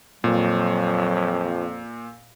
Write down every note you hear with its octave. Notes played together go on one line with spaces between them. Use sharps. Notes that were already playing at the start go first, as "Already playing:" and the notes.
F2 A#2 F#3